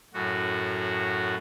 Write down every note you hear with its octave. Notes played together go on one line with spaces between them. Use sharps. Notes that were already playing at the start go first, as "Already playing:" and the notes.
F#2 A2 F#4